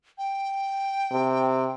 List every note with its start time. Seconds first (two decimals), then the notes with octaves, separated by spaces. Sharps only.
0.18 G5
1.12 C3